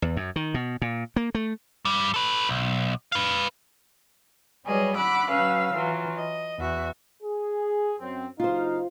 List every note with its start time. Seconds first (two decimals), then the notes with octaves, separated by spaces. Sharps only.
0.02 E2
0.17 F#2
0.36 D#3
0.54 B2
0.82 A#2
1.16 A#3
1.35 A3
1.85 G2 G3
2.14 A4 B4
2.49 B1
3.12 B4 F5
4.65 F#3 G3 G#4 B4 C#5 D#5
4.96 F#5 B5 D6 E6 F#6
5.30 F#3 C#4 B4 F5 E6
5.74 E3 F#3 F4
6.16 D#5
6.59 E2 F#4 E5
7.23 G#4
8.00 F#2 C4
8.40 F#1 D#4 F4 C5 F5